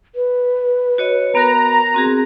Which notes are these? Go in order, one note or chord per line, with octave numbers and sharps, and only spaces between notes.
B4
F#4 C#5 D#5
B3 F#4 A#4 A#5
C4 F#4 G#4